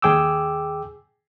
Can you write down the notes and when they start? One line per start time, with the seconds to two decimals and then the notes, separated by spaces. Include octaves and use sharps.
0.02 D#2 G#4 G5 D6 E6